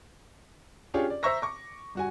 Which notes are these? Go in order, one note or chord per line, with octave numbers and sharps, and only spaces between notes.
C#4 D4 F4 G4 G#4 C#5
D5
C5 E5 A#5 C#6 E6 A#6
C#6 D6
G2 F#4 G#5